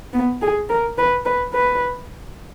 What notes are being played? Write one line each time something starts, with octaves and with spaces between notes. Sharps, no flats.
B3
G#4
A#4
B4
B4
B4